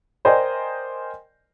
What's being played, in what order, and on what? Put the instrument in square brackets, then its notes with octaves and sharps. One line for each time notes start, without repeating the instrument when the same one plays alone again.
[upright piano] A#4 C5 D5 D#5 G5 G#5